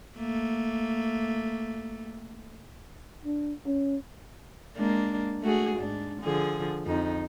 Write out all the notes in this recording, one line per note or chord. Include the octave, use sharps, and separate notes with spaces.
A3 A#3
D4
C#4
G#3 A#3 D4
A3 F#4 G#4
G#2 D4
D3 F3 G#4
F2 D#4